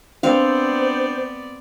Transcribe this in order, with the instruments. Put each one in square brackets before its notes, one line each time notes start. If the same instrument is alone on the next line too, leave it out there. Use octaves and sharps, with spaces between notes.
[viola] B3 D5 [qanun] C4 F5 [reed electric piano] D4 [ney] C5